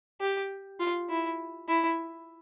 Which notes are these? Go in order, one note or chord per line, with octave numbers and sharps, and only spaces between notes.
G4
F4
E4
E4